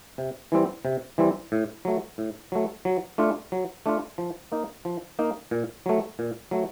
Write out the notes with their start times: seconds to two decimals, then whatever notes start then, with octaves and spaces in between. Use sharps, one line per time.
0.18 C3
0.52 E3 G3 C4
0.85 C3
1.18 E3 G3 C4
1.52 A2
1.85 F#3 A3
2.18 A2
2.52 F#3 A3
2.85 F#3
3.18 A3 D4 F4
3.52 F#3
3.86 A3 D4 F4
4.18 F3
4.52 A#3 D#4
4.85 F3
5.19 A#3 D#4
5.51 A#2
5.86 F#3 A3
6.19 A#2
6.51 F#3 A3